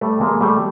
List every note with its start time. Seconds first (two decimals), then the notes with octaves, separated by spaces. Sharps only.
0.01 G3 A3
0.21 G#3 A#3
0.41 G3 A3